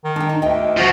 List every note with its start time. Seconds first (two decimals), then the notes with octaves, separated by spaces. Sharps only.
0.04 D#3
0.16 D4 G5
0.29 D#4
0.42 D2 D#5 G5
0.77 F3 F#4